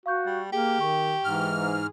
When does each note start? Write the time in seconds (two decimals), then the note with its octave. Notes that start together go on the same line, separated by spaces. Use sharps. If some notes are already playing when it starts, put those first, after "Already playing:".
0.06 F#4 F5 C#6 G6
0.26 G3
0.52 A#3 G4 G#4
0.81 D#3 C#6
1.24 G#2 E3 F6
1.66 G#4